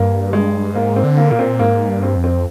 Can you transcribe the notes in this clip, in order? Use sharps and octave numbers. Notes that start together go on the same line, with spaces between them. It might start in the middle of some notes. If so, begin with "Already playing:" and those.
Already playing: G2 A#3
G#3
G#2 A#3
C4
D3
A#3
A#2 A#3
C4
G#2 A#3
G2
C4
F2
C4